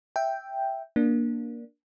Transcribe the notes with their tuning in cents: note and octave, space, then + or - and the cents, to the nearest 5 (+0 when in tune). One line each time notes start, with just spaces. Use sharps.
E5 +0 G5 +0
A#3 +15 D4 +0